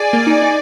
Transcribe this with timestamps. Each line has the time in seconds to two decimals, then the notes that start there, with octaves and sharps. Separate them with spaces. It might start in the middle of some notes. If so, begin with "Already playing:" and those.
Already playing: G#4 D5 G#5
0.13 A#3
0.27 D#4
0.42 D#4